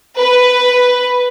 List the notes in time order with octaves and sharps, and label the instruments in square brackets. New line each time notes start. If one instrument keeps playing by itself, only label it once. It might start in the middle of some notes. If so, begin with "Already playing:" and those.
[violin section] B4